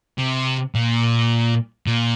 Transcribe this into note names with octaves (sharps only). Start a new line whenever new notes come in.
C3
A#2
A#2